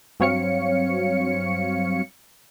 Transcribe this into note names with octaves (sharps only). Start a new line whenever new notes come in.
G2 F#3 C4 C#5 F5 C#7